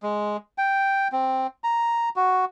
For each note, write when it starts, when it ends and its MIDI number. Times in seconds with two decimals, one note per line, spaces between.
0.03 0.37 56
0.58 1.08 79
1.12 1.47 60
1.64 2.09 82
2.16 2.45 66